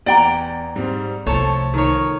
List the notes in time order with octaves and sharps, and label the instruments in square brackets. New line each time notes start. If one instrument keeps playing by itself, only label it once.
[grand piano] E2 [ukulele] D5 G5 A#5
[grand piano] G#2 G3 C4
[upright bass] C2 [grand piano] F3 A3 [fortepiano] C#5 A5
[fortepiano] D#3 C#5